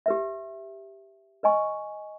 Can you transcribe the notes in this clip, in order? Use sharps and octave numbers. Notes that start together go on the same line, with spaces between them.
G4 B4 E5
B4 D#5 G#5 C#6